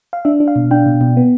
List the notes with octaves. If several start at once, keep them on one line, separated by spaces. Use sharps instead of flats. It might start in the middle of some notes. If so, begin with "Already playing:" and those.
F5
D4 E5
D4
F5
B2
D4 G5
B2
B2
B3